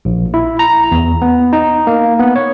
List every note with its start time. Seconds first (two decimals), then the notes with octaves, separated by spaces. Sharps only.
0.05 A#1
0.34 E4
0.59 A#5
0.91 E2
1.22 B3
1.53 D#4
1.87 A#3
2.20 B3
2.36 C#5